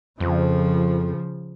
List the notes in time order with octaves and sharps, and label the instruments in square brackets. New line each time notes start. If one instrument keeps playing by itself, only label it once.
[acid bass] F2 [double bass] C#3 F3